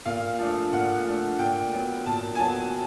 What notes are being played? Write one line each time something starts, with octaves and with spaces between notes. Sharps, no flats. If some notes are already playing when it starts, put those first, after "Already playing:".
A#2 F5
F3 A3 D4
A#2 F#5
F3 A3 D4
A#2 G5
F#3 B3
A#2 A5
G#5
F#3 B3 A5